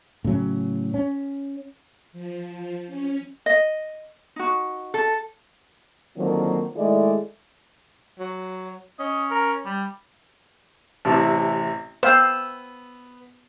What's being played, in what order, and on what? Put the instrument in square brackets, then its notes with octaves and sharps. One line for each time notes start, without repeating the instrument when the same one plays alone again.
[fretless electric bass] A2 C#3 F#3 C#4
C#4
[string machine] F3
C#4
[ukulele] D#5
D#4 F#4
[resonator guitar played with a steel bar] A4
[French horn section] D3 D#3 F3 F#3 A#3 C4
D#3 G#3 A3 E4 D5
[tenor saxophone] F#3
[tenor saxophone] C#4 [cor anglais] D#5
[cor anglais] A#4
G3
[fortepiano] A1 C3 E3 [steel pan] A5
[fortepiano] B3 [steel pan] C5 F5 G5 [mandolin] E6